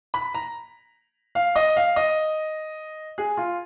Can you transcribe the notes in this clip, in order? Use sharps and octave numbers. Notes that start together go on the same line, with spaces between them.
B5
A#5
F5
D#5
F5
D#5
G#4
F4